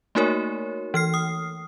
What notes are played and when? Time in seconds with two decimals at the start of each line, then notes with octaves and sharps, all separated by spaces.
0.15 A3 A#3 D#4 F#4 A#4 C#5
0.94 E3 F6 C7
1.14 D#6